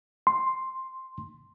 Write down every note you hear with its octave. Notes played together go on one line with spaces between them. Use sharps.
C6